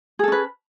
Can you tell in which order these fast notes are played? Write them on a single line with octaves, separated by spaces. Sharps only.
G#4 A4 C#4 B4